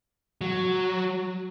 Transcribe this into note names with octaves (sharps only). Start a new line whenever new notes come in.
F#3